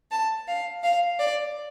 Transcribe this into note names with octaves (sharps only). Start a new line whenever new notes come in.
A5
F5
F5
D5